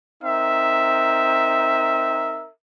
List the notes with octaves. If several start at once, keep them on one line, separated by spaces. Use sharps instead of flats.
C4 D#4 A#4 E5